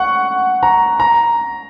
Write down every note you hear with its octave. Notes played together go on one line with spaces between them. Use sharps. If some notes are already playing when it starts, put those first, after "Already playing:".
Already playing: F#5 C#6
A#5
A#5